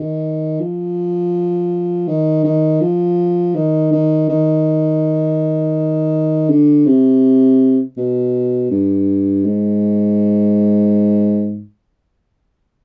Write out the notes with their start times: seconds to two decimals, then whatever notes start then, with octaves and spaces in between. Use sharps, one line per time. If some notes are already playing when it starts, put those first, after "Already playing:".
Already playing: D#3
0.60 F3
2.08 D#3
2.44 D#3
2.81 F3
3.55 D#3
3.92 D#3
4.29 D#3
6.50 D3
6.86 C3
7.97 B2
8.71 G2
9.44 G#2